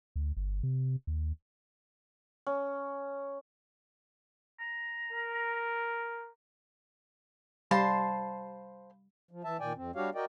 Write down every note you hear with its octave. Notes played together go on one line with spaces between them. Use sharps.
D2
G1
C3
D#2
C#4
A#5
A#4
G3 C5 F5 A5 B5 C6
F3
E3 E5 A5
A#2 D#3 D5 G5 G#5
F2 C4
G3 D4 F#4 G4 C#5 F5
F#4 A#4 D5 D#5 G5